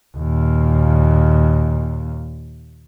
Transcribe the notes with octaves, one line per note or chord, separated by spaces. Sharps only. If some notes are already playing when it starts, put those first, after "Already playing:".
D#2 A#2